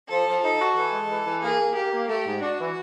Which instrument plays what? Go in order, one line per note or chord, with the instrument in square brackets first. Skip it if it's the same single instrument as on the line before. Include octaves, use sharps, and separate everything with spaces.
[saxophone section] F3 [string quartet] A4
[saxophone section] F3
[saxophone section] D#4 [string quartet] A4
[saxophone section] F#4
[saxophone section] E3 [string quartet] A4
[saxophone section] G#3
E3
E3
[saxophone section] A#3 [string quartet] G#4
[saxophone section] A#3
[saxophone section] A#3 [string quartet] G4
[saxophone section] A#3
[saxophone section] A3 [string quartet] G4
[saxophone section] G#2
[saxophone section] D4 [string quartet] F#4
[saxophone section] E3